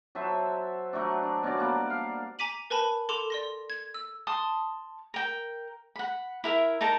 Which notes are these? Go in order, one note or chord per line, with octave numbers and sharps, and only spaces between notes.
F#3 A4 C5 E5
F#3 A3 D4
D4
B2 C#4 D4 D5
G3 A#3 D4 D5
F5
G#5 A#5 D6 B6 D#7 F#7
A#4 B4 G#5 A5 B5
A4 C6 D6 E7 F7
D5 C6 A#6
G#6
E6
A5 C6 D#6
A#4 G5
F#5 B5
E4 A#4 E5
D#4 A#4 A5 A#5